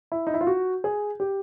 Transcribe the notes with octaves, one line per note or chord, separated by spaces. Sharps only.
E4
D#4
E4
F4
F#4
G#4
G4